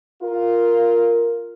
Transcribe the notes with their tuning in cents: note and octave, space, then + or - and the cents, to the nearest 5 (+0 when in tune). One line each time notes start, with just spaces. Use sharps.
F4 +0 A#4 +0